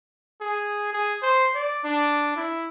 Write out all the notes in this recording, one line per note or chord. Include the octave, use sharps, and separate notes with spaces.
G#4
G#4
C5
D5
D4
E4